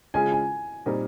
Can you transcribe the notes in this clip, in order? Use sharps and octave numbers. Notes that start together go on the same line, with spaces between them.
C#3 G#3 C#4 F4 G#4 G#5
G#5
A#2 G3 C4 D#4 A#4